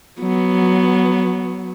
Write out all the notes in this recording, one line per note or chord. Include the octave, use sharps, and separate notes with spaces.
F#3 B3